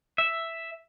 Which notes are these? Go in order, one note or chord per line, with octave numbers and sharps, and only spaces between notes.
E5